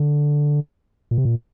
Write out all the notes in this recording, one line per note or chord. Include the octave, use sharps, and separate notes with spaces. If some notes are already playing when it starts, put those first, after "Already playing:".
Already playing: D3
A#2
C3
A#2